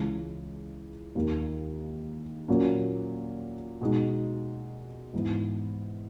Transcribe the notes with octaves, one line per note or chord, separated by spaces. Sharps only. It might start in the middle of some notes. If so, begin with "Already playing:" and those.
Already playing: C#2 C#3 E3 G#3
D#2 D#3 A#3
A#2 F#3 A#3 C#4
B2 G#3 D#4
G#2 E3 B3 E4